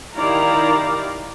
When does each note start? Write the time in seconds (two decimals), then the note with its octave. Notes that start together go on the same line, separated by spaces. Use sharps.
0.17 D#3 E4 G4 D5 F5 A#5